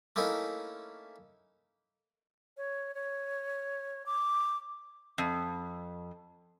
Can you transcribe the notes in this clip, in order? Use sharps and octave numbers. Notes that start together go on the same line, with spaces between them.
A3 A#3 C#4 D#4 E4
C#5
C#5
D6
F2